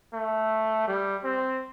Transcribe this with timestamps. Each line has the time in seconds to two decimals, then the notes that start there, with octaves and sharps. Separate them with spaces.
0.13 A3
0.88 G3
1.24 C4